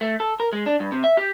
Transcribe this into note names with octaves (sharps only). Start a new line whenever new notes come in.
A3
A4
A#4
G#3
D4
G2
C3
E5
G4